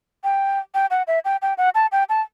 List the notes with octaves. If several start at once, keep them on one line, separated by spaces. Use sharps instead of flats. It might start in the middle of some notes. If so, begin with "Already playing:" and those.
G5
G5
F#5
E5
G5
G5
F#5
A5
G5
A5